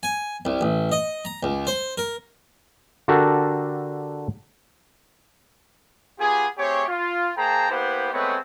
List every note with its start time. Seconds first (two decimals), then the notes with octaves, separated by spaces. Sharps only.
0.03 G#5
0.45 C2
0.61 A1
0.92 D#5
1.25 A#5
1.43 C#2
1.67 C5
1.98 A#4
3.08 D3 D4 F#4 G4 A4 A#4
6.19 B3 F4 G4 G#4
6.58 A3 C4 G4 G#4 C#5
6.88 F4
7.37 A#3 G#4 C5 G5 A5 A#5
7.70 A#3 B3 E4 G4 B4 C5
8.12 G#3 A3 B3 C4 B4 C#5